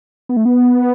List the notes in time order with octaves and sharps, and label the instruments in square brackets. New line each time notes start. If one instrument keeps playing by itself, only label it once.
[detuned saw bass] B3
A3
B3